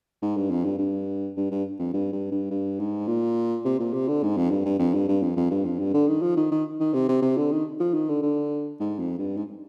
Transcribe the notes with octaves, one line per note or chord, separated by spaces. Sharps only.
G#2
G2
F2
G2
G2
G2
G2
F2
G2
G2
G2
G2
G#2
A#2
C3
A#2
C3
D3
G#2
F2
G2
G2
F2
G2
G2
F2
F2
G2
F2
G2
D3
D#3
F3
D#3
D#3
D#3
C3
C3
C3
D3
D#3
F3
D#3
D3
D3
G#2
F2
G2
G#2